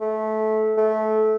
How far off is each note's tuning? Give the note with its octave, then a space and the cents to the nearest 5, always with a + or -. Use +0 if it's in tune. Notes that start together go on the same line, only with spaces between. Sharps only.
A3 -20
A3 -20